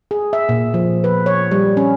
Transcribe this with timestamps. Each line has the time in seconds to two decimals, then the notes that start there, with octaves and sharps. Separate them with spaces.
0.11 G#4
0.33 E5
0.49 A#2
0.74 F3
1.04 B4
1.26 C#5
1.51 G3
1.77 C#4